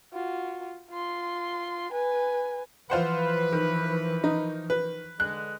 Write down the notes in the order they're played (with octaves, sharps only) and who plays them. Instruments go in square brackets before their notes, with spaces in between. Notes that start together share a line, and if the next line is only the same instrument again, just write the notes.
[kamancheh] F4 F#4
F4 C6
B4 G#5
[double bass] E3 F3 [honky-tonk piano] F4 C5 F#5 [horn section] B4
[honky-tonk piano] D#3
[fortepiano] D#4
B4
[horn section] D3 G#3 [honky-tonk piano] F#6